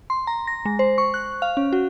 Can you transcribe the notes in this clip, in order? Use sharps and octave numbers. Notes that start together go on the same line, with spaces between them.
C6
A#5
A#6
G#3
C5
C#6
F#6
F5
C#4
F#4